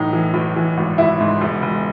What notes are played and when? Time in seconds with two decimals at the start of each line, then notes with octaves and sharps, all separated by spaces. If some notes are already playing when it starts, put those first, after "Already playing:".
Already playing: B1 A2 E3 D#4
0.13 E3
0.34 B1
0.56 E3
0.77 G#1
0.98 G#1 E4
1.20 G#2
1.41 E1
1.62 E1